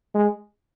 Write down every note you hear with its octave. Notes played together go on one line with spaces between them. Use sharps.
G#3